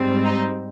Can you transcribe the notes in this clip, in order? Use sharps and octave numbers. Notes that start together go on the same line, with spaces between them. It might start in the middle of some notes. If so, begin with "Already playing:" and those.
Already playing: G#2 G3 C4
D#4